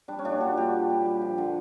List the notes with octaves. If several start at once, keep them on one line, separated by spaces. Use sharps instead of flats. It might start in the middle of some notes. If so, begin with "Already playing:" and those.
G3 D4
C#4
A#2 D4
G3 F#4
G3 G4
A#2
G3
G3
F3
D3